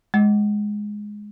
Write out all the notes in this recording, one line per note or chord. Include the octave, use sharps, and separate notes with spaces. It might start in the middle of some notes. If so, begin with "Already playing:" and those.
G#3